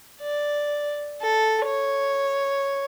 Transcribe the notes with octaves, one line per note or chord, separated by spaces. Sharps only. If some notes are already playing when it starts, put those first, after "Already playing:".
D5
A4
C#5